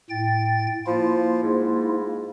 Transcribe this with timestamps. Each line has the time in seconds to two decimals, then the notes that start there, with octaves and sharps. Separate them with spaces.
0.10 A2 G5 A6
0.87 F3 A#3 E4 F4
1.43 G#2